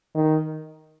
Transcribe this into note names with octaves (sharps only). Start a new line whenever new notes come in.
D#3